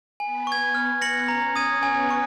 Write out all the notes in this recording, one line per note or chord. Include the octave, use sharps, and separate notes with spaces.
B3 B4 G#5
C#6 G#6
B3 B4 F6
A#6 C#7 F#7
C#4 C#5 A#5
D#6 G#6 D#7
B3 B4 G#5
C#6